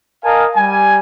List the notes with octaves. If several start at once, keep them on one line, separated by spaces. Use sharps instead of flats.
A#4 D#5 F5 G#5 A5
G3 G#5